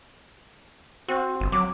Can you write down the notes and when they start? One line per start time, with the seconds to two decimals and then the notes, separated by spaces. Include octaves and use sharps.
1.08 C4 F#4
1.40 G1
1.52 F#3 D6